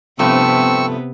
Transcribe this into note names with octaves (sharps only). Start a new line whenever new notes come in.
G2 C3 F3 A3 B3 C4 C#6 E6